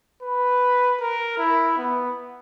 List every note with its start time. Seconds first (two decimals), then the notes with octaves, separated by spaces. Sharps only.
0.23 B4
1.00 A#4
1.38 E4
1.78 B3